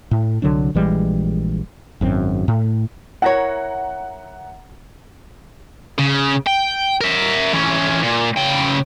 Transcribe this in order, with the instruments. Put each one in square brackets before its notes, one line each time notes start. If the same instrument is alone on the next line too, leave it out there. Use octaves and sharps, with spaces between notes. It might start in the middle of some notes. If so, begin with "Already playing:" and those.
[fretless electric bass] A2
C2 D3 F#3 D4
A#1 E3 G3 G#3
G#1 F#2 C4
A2
[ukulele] E4 A#4 C#5 [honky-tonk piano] F#5 A#5 A#6
[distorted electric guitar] C#3
G5
A#4 E5
E3 C#4
A#2
C#3 G5